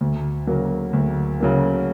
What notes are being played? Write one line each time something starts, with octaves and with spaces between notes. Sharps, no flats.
D2
C#3 F#3 A#3
D2
C#3 F#3 A#3